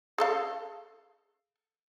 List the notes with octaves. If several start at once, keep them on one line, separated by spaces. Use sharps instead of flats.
G#4 A4 F5